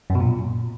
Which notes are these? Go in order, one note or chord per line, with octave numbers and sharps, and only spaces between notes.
F#2
B2
A#2